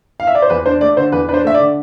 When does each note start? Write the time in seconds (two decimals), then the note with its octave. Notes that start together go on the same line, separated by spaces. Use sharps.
0.20 F5
0.27 E5
0.35 D5
0.42 C5
0.50 E2 B4
0.66 D4 C5
0.81 A3 D5
0.97 D3 C5
1.12 E2 B4
1.28 D4 B4
1.34 C5
1.44 A3 E5
1.54 D5
1.60 D3